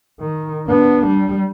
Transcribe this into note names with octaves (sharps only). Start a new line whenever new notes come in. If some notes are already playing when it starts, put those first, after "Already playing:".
D#3
B3 D4
G3